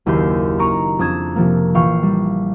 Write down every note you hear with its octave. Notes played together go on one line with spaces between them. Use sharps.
F#1 D#2 E4 G4 C6 G6
D#4 A#5 C#6 D7
F2 D4 D#6 G#6 E7
C3 F3 A#3
A#1 E3 F5 G5 C#6
G3